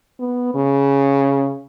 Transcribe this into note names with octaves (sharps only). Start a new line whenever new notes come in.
B3
C#3